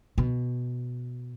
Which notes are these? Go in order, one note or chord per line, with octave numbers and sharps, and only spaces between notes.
B2